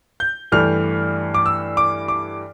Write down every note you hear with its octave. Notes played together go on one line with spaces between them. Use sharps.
G6
G2 E3 A3 F6
D6
E6
D6
D6